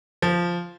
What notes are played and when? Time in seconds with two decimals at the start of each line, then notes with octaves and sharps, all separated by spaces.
0.22 F3